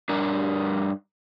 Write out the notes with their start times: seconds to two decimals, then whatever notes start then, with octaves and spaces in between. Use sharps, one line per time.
0.09 G2 D4 A#4